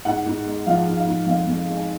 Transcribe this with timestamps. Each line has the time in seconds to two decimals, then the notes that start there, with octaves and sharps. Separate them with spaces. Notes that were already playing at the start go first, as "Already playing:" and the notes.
0.05 G#2 F#5
0.26 G#2
0.45 G#3
0.67 F3 F5
0.87 G#2
0.97 F5
1.07 G#2
1.26 F2 F5
1.47 F2
1.68 G#3
1.77 G#5